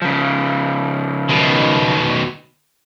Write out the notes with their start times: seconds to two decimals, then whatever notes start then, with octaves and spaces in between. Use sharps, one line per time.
0.02 C#3 F3
1.29 B2 D#3